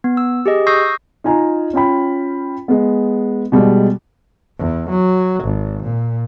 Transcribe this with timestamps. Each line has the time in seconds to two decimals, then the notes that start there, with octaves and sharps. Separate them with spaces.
0.04 B3
0.17 E6
0.46 G4 G#4 D#5
0.67 C#6 D#6 E6 G6 A#6 C7
1.24 D#4 F4 G#5 A#5
1.73 C#4 F4 G5 B5
2.68 G#3 B3
3.52 B2 G3 G#3
4.59 E2
4.90 F#3
5.44 G#1
5.83 A#2